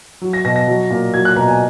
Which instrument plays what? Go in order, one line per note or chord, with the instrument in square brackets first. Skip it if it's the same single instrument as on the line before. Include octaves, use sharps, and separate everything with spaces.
[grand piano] F#3
A#6
B2 A#6
A#6
F#3
A#2
F#3 G#6
F#6
B2 A#5
G#5